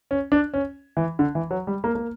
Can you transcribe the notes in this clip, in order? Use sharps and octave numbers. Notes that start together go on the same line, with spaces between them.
C#4
D4
C#4
E3
D3
E3
F#3
G3
A#3
A#3